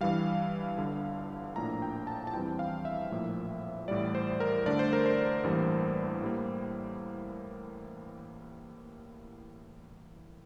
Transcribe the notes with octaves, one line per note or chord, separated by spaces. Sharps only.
G2 E3 G3 F5
G1 G2 D3
A#1 A2 F3 A#3 D4 A#5
G5
A5
A5
E2 E3 G3 C4 G5
F5
E5
A#1 A2 F3 A#3
A1 A2 G3 D5
C5
A#4
G2 D3 A3 D4 D5
C5
A#4
C5
A1 G2 E3 G3 A#3
A2 G3 A#3